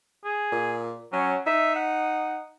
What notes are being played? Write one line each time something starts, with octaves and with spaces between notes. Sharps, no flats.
G#4
A#2
F#3 C#4
D#4 E5
F#5